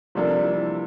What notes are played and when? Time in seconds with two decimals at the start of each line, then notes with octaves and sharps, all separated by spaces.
0.15 C3 F3 G3 A#3 D4 A4
0.45 E3